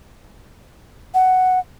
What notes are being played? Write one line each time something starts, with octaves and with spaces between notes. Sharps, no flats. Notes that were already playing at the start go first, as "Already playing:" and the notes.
F#5